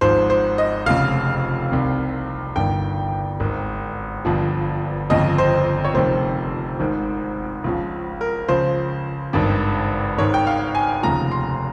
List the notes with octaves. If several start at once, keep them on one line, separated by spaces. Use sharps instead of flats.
G#1 G#2 F3 C5
C5
D#5
F1 F2 C#3 F5
C2 C3 D#3
G1 G2 D#3 G5
G#1 G#2 D#3
G1 G2 F3
G1 F2 C#3 F3 D#5
C5
C#5
F1 F2 C3 D#3 C5
G#1 G#2 D#3
C#2 C#3 F3
A#4
C#2 C#3 F3 C5
G#1 G2 D#3
G#1 G#2 D#3 C#5
G5
F5
G#5
F1 D#2 C#3 F3 A#5
C6